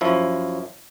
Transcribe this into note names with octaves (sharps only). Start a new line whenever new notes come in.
F#2 F3 E4